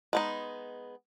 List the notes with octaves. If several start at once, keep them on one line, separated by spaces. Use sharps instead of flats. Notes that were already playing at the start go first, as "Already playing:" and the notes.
G#3 B3 D#4